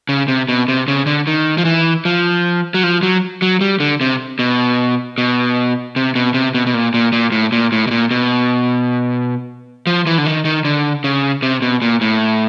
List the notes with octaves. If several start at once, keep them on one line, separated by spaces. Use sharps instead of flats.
C#3
C3
B2
C3
C#3
D3
D#3
F3
E3
F3
F#3
F3
F#3
F#3
G3
D3
C3
B2
B2
C3
B2
C3
B2
B2
A#2
A#2
A#2
A2
A#2
A2
B2
A#2
B2
F3
E3
D3
D#3
D#3
D3
C#3
C3
B2
A#2
A2